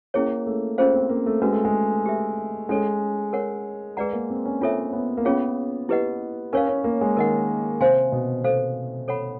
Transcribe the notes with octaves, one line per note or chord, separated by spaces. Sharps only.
A#3 C#4 E4 G#4 C#5
A3
C#4 F4 G#4 C5 F5
C4
A#3
A3
G#3 C#4 F#4 B4
A3
G#3
G4 B4 E5
G#3 C#4 E4 A4 C#5
A#4 C#5 F#5
G#3 G#4 B4 D5 F#5 A#5
A#3
C4
C#4
C4 D4 F4 A4 C#5 E5
B3
A#3
B3 C#4 F4 G#4 C#5 F5
E4 G4 B4 D#5 F#5
C#4 A#4 C#5 F5
C#4
A#3
G#3
D#3 A#4 D#5 F#5
C3 C5 F5 G#5 C6
B2
B2 A4 C5 F5
A4 C#5 F#5 B5